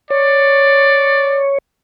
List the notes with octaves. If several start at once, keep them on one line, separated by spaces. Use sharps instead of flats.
C#5 D5